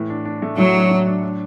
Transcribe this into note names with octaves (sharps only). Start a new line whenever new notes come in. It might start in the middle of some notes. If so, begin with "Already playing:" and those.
Already playing: A2 E3
D4
D4
A3
A2 F#3
D4
A2
D4
D4